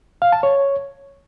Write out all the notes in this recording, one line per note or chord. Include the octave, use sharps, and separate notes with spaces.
F5
A5
C#5